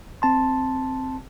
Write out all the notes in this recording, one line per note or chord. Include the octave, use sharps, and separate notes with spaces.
C4 A5 C6